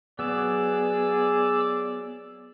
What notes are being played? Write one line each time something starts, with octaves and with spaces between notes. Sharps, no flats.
F#3 B3 G#4 D5 E6